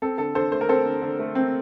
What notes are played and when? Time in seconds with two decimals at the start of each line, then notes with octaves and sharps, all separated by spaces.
0.02 C4 A4
0.18 D3 A4
0.35 D3 A4 C5
0.52 A3 C5
0.61 A#4
0.69 C4 A4 C5
0.86 D3
1.02 D3
1.19 A3
1.35 C4